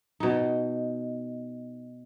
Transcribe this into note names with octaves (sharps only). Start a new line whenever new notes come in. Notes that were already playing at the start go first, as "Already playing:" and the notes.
B2 D#4